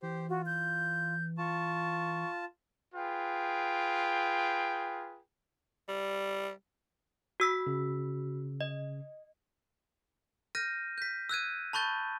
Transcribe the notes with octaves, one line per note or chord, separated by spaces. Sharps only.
E3 G4 C5
F4 F#4
G6
F4 A5 C#6
F4 G#4 B4 G5
G3
F#4 E6 B6
C#3
D#5
F6 G6 A#6 D#7
G6 B6
E6 F#6 G#6 D#7
A5 B5 C#6 G6 A6